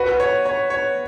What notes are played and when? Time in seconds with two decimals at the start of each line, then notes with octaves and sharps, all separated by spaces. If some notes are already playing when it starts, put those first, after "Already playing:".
Already playing: F#4 B4
0.20 C#5
0.45 C#5
0.70 C#5